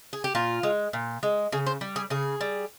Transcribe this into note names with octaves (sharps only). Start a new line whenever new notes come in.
G#4
G4
A#2 F4
G#3
A#2
G#3
C#3 G#4
C5
G3
G#4
C#3 G#4
G3